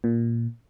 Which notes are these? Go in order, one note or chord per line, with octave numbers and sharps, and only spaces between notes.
A#2